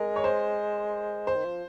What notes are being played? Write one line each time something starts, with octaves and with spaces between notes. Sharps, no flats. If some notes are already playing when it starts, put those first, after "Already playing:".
Already playing: G#3 A#4
C#5
C5
C5
D#3
F3